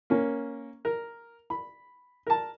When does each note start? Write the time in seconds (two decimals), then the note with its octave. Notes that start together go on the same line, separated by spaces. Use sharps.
0.10 A#3 C#4
0.85 A#4
1.50 B5
2.27 A#4 A5